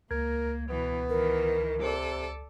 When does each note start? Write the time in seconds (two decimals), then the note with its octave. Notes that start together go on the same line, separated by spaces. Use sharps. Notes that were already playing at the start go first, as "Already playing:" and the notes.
0.11 C#2 A#3 A#4 G#6
0.70 B2 E3 B3
1.10 D#3 E3 A#4
1.82 C3 A4 D5